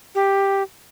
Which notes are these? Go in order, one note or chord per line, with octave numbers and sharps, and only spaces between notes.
G4